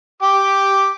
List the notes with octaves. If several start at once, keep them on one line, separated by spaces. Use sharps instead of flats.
G4 G5 D6